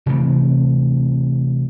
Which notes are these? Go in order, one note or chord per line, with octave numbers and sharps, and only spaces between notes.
C3 E3 A3 C4